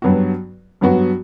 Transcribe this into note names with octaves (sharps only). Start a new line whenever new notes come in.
G2 F#3 B3 F#4
G2 F#3 B3 F#4